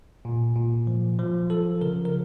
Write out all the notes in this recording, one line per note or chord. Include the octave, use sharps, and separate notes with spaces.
A#2
A#2
F3
F3
F3 A4
C#3 A#4
A#4